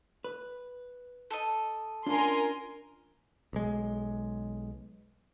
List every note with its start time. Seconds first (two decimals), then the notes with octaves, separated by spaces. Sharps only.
0.24 B4
1.31 A4 D#5
2.06 C#4 D4 F4 A#4 G#5 C6
3.53 B1 G#3